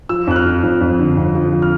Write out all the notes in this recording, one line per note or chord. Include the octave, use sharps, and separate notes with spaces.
F3 E6
F2 F#6
F6
F3
F2
F2
D3
F2
F3
F3
F6